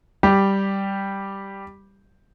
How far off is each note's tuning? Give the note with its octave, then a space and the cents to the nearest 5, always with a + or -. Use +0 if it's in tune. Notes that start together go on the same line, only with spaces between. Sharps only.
G3 +0 G4 +0